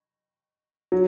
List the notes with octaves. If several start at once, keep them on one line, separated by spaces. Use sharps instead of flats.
F#3